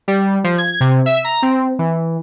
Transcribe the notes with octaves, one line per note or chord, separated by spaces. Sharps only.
G3
F3
G#6
C3
E5
A#5
C4
E3